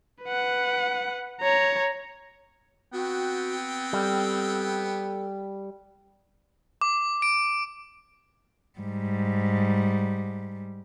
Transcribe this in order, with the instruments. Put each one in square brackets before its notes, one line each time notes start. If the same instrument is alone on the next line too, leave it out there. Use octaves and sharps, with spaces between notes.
[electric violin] B4 F#5
C#5 A#5
[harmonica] B3 G5 [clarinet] C4 [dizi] F#4
[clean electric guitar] G3 [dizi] A4
[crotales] D6
D7
[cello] G#2 G3